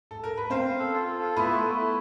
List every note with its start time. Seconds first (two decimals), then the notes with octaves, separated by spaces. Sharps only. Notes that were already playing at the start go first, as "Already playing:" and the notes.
0.11 A4
0.24 A#4
0.38 B4
0.50 C4 C5 F5
0.65 F5
0.79 A4
0.93 F4
1.07 A4
1.22 F4
1.36 B3 E4 B4
1.51 A3
1.66 A3
1.80 E4